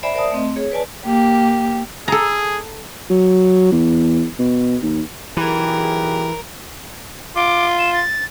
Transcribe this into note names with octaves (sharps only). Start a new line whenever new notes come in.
C5 D5 E5 G#5 A#5 B5
A#4 C5 D5 E5 A5 D#6
A3 C4 D#5
G#4 C#5
B4 D5 G#5 A5
A#3 G4
G#4 A4 A#5
F#3
E2
B2
D#2
B1 E3 G4 G#4 A#4
F4 D6
E7
A6